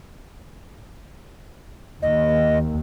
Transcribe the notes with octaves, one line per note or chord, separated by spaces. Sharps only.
D#2 D#5